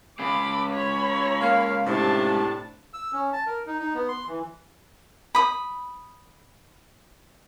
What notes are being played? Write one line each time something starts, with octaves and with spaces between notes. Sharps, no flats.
G#3 C#4 G#4 B5 D6
C#5 B5
A#3 F5
A2 C3 D4 A5
E6
C#4
A5
A#4
D#4
D#4
B3
C6
E3
B5 D#6